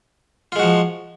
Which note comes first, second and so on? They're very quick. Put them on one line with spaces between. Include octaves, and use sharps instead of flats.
F4 G#3 F#4 F3